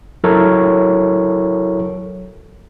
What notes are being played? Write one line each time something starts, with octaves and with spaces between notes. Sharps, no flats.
F#3 E4 A4 A#4 C#5